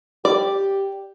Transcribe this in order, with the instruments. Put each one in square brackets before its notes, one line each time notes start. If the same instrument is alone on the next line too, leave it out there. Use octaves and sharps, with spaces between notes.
[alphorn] G4 [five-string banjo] D5